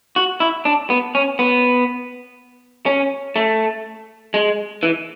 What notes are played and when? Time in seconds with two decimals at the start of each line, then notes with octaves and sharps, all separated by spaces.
0.16 F#4
0.40 E4
0.65 D4
0.90 B3
1.15 C#4
1.39 B3
2.86 C#4
3.36 A3
4.34 G#3
4.83 E3